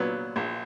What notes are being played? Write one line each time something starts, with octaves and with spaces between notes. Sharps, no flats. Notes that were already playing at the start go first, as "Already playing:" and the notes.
Already playing: A#2 F#3 B3
A#1